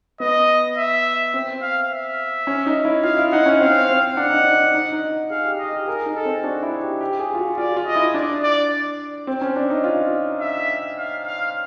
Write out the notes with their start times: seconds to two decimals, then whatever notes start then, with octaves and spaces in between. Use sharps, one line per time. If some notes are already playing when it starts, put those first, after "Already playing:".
0.20 B3 D#5
0.77 E5
1.34 C4 E5
1.62 F5
1.91 E5
2.47 C#4
2.66 D#4
2.85 E4
3.03 F4 F5
3.18 E4
3.32 D#4 F#5
3.46 C#4
3.60 C4 F5
3.89 C4
4.17 D4 F#5
4.30 D#4
4.44 D4
4.74 D#4
4.92 D#4
5.30 G#4 F5
5.45 G4
5.59 D#5
5.73 G4
5.88 G#4 A#4
6.06 D#4
6.15 A4
6.25 C4
6.44 D4 F#4
6.63 E4
6.82 G4
7.01 G4
7.19 G#4
7.34 F4
7.39 F#4
7.58 F4 D5
7.76 F4
7.86 D#5
7.96 E4
8.14 D4 D5
8.43 D5
9.27 C4
9.42 C#4
9.56 D4
9.70 D#4
9.84 F4
10.41 E5
10.98 F5
11.27 F5